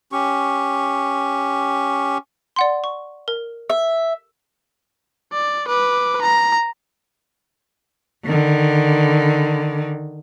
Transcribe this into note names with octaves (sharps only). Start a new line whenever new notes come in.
C#4 G4 C#6
D5 F#5 C6
C#6
A#4
E5
D5
B4 D6
A#5
D3 D#3